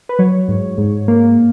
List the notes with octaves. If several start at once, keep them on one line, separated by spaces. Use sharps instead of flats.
B4
F#3 C#5
G#2
G#2
A#3